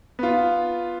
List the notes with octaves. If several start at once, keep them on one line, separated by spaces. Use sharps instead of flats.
B3 F4